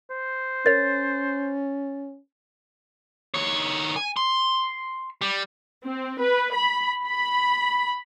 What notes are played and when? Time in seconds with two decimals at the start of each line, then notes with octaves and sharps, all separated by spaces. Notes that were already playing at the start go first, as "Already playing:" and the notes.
0.11 C5
0.66 C#4 A#4 C#5 A6
3.34 D#3 C#5
3.96 G#5
4.17 C6
5.21 G3
5.82 C4
6.20 B4
6.55 B5
7.04 B5